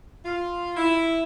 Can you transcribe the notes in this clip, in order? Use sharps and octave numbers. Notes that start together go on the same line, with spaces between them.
F4
E4